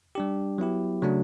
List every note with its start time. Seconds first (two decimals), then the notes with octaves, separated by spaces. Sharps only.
0.15 G3 D4 G4
0.58 F#3 B3 E4 G4
1.02 C#3 F#3 A3 D4 F#4